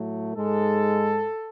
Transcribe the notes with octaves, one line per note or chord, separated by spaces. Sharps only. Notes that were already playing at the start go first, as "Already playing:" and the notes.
Already playing: A2 F#3 A3
G#2 G#3 A4